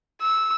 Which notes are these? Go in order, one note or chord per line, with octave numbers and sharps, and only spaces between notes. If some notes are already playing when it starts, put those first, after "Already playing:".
E6